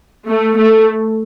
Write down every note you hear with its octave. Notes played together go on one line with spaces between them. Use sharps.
A3
A3